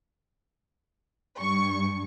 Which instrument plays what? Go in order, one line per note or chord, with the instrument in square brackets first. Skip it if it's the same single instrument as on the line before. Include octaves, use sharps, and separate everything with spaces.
[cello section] G2 [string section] C#6